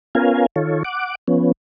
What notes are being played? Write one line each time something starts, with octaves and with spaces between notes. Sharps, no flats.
B3 C#4 F4 A#4 F5 G#5
D#3 F4 A4 C#5
F#5 D6
F3 B3 C#4